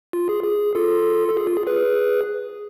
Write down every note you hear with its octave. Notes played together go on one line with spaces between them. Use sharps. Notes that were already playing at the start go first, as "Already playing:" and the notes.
F4
G#4
G#4
F4 A4
A4
G#4
F4
G#4
G#4 B4